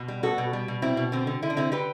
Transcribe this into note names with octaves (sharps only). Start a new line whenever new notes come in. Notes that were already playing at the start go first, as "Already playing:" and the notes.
Already playing: B2
G3
B3 F#4 A4
B2
G3
B2
B2 C4 E4
B2
D3 C4
D3
D3 E4
D4
D3 C4 E4
D3 G4 B4